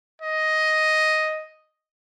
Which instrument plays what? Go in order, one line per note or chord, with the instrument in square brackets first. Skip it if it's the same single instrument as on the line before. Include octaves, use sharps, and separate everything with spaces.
[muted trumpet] D#5